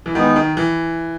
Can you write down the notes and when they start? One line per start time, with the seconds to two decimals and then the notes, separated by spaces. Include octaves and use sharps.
0.06 E3
0.14 D#3 G#3 B3 D#4
0.36 D#3
0.57 E3